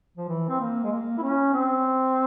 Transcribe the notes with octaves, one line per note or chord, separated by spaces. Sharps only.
F3
E3
C4
A#3
G#3
A#3
E4
C#4
C4